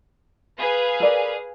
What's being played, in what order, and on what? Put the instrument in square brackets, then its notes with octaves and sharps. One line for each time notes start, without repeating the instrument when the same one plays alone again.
[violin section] G#4 B4 F5
[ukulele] A4 A#4 D5